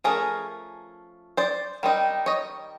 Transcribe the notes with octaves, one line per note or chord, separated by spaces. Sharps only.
F3 A3 C#4 G#4 A#4
C5 D5
D#3 G3 C4 D#4
C#5 D#5